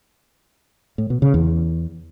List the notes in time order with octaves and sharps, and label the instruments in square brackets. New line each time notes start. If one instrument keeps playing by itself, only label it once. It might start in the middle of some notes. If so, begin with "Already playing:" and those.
[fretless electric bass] A2
B2
C#3
E2